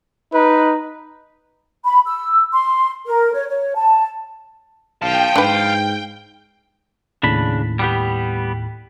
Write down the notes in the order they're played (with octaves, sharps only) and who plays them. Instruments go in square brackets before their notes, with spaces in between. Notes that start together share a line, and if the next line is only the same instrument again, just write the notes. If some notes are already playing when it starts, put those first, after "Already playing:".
[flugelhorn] D#4 [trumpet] B4
[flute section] B5
E6
C6
A#4
C#5
C#5
A5
[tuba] B1 [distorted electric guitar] F5 A5 [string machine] G5
[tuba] G#2 [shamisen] D4 B4
[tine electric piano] D#2 A2 [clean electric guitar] C#3 D4 B5
[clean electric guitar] G3 B3 G4